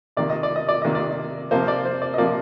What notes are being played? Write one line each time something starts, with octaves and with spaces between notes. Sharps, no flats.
C3 D#3 A#3 D5
D#5
D5
D#5
D5
C3 D#3 A#3 D#5
D5
C3 F3 A#3 C5
D5
C5
D5
D#5
C3 F3 A#3 D5